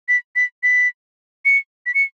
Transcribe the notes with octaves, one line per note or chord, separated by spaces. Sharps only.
B6
B6
B6
C#7
B6
C#7